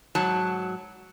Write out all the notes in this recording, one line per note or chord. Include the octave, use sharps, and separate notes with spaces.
G#2 F#3 A5